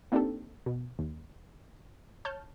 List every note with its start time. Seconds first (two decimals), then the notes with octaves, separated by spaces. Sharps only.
0.12 A#3 C4 D4 D#4 G4 A4
0.66 B2
0.99 D#2
2.25 C#5 A5 F6 G6